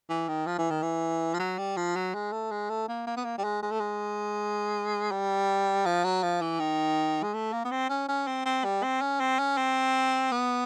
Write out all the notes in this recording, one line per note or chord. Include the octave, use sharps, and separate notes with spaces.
E3
D#3
F3
E3
D#3
E3
F3
F#3
G3
F3
F#3
G#3
A3
G#3
A3
A#3
A#3
B3
A#3
G3
G#3
G#3
A3
G#3
G3
F3
F#3
F3
E3
D#3
G#3
A3
A#3
B3
C4
C#4
C#4
C4
C4
G3
C4
C#4
C4
C#4
C4
B3